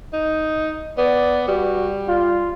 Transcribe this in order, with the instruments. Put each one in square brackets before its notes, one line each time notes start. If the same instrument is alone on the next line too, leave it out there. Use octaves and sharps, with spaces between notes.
[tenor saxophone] D#4
[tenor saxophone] B3 [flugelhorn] D5
[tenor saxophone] G3 [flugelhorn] F#4
[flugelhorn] F4